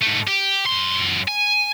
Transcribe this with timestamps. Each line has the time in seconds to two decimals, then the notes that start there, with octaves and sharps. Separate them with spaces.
0.02 G#2 A3
0.27 G4
0.66 F#2 C6
1.28 G#5